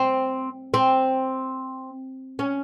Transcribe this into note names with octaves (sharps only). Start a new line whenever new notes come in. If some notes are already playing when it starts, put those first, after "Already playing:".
Already playing: C4
C4
C#4